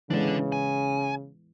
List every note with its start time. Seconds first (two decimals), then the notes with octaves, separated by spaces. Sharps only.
0.10 C#3 E3 G#3 D4 A4
0.52 G#5